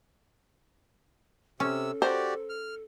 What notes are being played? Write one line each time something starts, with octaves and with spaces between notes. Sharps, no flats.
C3 C#4 A4 E6
F#4 G4 A#4 C5 D5
F6